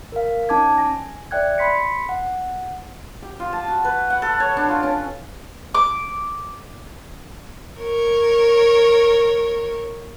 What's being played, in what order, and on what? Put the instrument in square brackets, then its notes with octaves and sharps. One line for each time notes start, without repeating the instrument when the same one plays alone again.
[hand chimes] A#4 F5
C#4 D#4 A5 D6 G#6
G#5 A#6
D5 E5 G5 F#6 G#6
B5 C6 B6 C#7
F#5
[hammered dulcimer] G4
F4
A5
F#4
B4
F#5
A4
C#5
D4
F4
C#4
[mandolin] D6
[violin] A#4 C#5